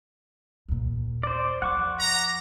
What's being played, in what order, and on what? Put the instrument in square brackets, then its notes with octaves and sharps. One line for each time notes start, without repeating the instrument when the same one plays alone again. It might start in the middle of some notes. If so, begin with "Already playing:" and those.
[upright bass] D#2 A#2
[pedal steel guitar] C5 D5
[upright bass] F2 [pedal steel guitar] F#5 C#6 D6
[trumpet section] A#5